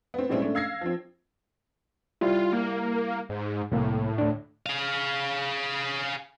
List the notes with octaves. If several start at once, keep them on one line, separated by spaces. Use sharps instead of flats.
B3 C4
A2 G3 G#3 C4 C#4 E4
A3 C#4 D4
F5 E6 G#6 A#6 C7
F3 C4
G3 E4 F4
A#3
G#2
C2 A2 A#3
D2 D4
G#4 F5